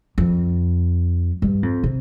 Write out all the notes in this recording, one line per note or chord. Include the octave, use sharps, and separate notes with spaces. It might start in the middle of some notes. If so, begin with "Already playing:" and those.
F2
G2
F2
C3